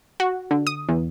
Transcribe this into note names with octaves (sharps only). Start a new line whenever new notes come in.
F#4
D3
D#6
E2